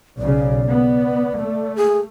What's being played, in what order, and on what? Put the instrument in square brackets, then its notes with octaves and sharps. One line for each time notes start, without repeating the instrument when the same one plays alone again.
[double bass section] B1 C#3 [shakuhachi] D5
[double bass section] B3
A3
[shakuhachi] G#4